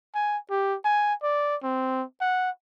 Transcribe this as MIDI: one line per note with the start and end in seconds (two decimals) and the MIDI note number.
0.15 0.38 80
0.50 0.76 67
0.85 1.14 80
1.23 1.56 74
1.63 2.04 60
2.21 2.50 78